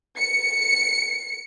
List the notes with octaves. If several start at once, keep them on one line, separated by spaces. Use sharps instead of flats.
C#7